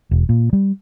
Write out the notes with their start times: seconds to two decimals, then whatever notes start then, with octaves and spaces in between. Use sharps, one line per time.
0.11 E1
0.29 A#2
0.53 G3